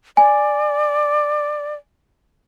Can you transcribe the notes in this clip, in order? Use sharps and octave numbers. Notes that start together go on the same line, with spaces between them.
D5 G#5